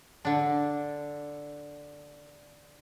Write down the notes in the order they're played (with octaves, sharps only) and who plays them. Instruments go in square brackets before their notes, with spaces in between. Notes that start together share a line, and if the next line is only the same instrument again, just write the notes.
[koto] D3 D4